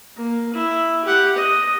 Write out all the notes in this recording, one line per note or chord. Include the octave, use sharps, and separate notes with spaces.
A#3
E4
G4 F#5
D#5